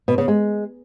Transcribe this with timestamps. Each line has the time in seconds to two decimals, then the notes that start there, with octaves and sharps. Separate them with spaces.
0.08 B2
0.18 C#3
0.28 G#3